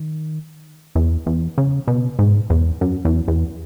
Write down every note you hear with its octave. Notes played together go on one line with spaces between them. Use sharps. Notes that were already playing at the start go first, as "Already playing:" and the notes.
Already playing: D#3
E2
E2
C#3
B2
G#2
E2
F#2
E2
E2